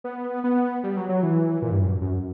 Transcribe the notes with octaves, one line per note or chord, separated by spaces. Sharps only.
B3
B3
G3
F#3
F#3
E3
A#2
G2
F#2
F#2